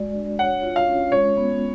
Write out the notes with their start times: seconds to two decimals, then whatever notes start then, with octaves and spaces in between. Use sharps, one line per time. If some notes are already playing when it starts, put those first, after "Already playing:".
Already playing: G#3 F#4 D5
0.14 D4
0.39 C#5 F#5
0.63 F4
0.76 F5
0.87 C#4
1.12 G#3 C#5
1.37 B3